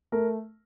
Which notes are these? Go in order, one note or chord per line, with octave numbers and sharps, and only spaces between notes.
A3 A#4